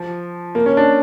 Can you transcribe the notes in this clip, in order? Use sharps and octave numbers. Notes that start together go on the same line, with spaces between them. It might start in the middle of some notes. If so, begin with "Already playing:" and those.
Already playing: F3
A#3
C#4
D4